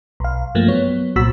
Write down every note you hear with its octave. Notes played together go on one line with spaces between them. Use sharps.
B1 F5
G2 F3 A3 A#3
F#3 B3 C#5
C2 A#2 F#4 E6 B6